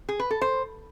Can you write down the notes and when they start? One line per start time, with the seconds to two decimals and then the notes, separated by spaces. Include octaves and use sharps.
0.09 G#4
0.20 B4
0.31 A4
0.41 C5